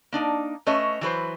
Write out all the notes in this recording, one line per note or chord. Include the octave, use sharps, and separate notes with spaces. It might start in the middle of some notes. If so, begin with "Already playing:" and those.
A#3 D4 D#4
A3 C#4 B4 C#5 D#5 E5
E3 F#3 B4 C5